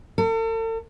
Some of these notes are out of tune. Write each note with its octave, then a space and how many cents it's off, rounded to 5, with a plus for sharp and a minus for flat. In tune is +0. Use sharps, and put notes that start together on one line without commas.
A4 +40